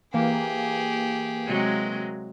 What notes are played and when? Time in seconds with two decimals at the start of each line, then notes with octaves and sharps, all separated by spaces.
0.14 E3 A#3 G4 G#4
1.46 C3 F#3 G#3